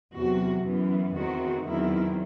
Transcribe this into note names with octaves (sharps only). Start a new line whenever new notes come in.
E2 C3 F#3 F#4
F#2 E3 B3
E2 D#3 A3 C4 F#4
E2 D#3 F#3 C4 E4